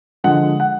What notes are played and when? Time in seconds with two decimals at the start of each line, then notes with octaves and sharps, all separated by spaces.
0.24 D3 F3 G#3 F#5
0.60 F#5